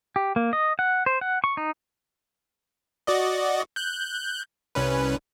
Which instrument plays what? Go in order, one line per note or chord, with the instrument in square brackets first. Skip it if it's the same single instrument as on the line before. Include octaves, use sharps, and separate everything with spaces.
[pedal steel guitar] G4
A#3
D#5
F#5
C5
F#5
C#6
D#4
[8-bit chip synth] F#4 D5 D#5
F#6 G6
C2 C#4 B4